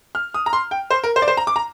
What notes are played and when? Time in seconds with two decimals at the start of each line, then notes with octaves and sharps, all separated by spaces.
0.15 F6
0.34 D#6
0.46 A#5
0.53 C6
0.71 G5
0.91 C5
1.04 A#4
1.16 C5
1.22 D5
1.28 C5
1.37 A#5
1.47 D6
1.56 A#5